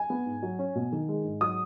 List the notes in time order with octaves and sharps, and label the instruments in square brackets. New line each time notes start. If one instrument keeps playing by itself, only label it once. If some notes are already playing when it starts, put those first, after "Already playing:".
Already playing: [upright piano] G#5
B3
G#2
F#3
C#4
B2
D#3
G#3
G#2
F#3 D#6